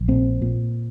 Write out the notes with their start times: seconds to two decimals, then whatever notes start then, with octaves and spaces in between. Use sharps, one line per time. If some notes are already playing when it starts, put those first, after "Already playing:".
Already playing: A#1
0.08 A#2 C4
0.42 A#2